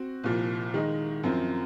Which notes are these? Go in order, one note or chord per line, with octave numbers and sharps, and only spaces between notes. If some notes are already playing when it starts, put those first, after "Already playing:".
Already playing: C4 F#4
C2 A#2 F3
D#3 G#3 D#4
F#2 F3 C4